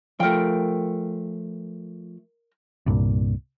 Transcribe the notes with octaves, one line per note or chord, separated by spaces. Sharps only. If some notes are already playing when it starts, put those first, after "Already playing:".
F3 A3 A#4 G5
C2 G2 A#2